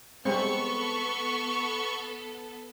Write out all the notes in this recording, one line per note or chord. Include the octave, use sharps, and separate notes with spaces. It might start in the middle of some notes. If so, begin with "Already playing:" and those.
G3 G#3 B3 C4 A4 C#6